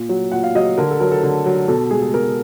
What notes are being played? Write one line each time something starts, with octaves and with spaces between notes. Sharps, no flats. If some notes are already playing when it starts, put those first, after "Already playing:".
Already playing: A#2
F#3
A#2 F#5
F5
F#3 D#5
D3 A#4
A4
F#3 A#4
A4
D3
F#3
B2 A4
G#3 G#4
G#4
B2 A#4